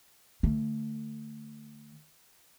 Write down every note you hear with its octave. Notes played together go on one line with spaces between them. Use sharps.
D3 A3